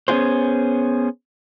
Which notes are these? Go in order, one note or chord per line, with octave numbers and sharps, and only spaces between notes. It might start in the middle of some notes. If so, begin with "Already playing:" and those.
B3 C#4 D4 F#4 G#4 C5